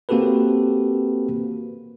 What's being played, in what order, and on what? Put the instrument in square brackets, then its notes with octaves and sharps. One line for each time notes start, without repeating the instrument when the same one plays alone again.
[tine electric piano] A#3 C4 F#4 G4 A4 B4